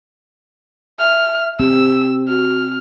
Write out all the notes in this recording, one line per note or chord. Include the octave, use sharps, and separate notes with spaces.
E5 F6
C4 G4 E6
F#4 F6